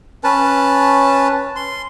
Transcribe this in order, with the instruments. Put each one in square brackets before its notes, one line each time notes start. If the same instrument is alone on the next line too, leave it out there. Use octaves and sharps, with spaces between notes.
[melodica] C#4 B4 A5
C6